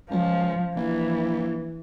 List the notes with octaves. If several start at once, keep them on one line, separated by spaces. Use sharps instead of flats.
C#2 F3
A#1 E3